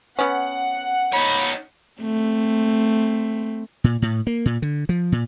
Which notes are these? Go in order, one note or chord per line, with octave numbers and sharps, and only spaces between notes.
B3 C#4 F#5
D#4 C#5 B5
A3 C4
A#2
A2
A#3
A#2
D3
F3
A#2